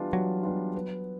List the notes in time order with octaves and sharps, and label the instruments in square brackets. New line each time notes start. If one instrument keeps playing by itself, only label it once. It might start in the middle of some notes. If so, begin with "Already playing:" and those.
Already playing: [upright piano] E3 G3 B3 D4 F4
[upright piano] E3 [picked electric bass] F#3
[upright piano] G3 B3 D4 F4
B3